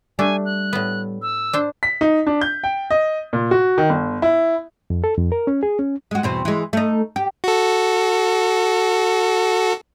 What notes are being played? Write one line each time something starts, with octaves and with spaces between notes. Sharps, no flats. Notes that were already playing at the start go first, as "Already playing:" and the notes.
G3 A3 D4 G#5
F#6
A2 B3
E6
D4 C5
B6
D#4
D4
G6
G5
D#5
A#2
F#4
D#3
G1
E4
F2
A4
F2
A#4
C#4
G#4
C#4
G#3 F#4
E2 B2 C4
E3 G#3
A3 D#4
G4
F#4 A4